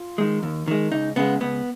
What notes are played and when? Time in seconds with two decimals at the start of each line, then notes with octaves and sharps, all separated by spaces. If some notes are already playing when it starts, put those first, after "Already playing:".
Already playing: F4
0.18 D#3 G#3
0.43 D#2
0.68 D#3 G#3
0.91 C#2 D#4
1.16 C#3 G#3 B3
1.40 C#2 B3